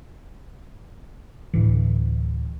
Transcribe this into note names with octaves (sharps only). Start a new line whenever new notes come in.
D2 A2 E3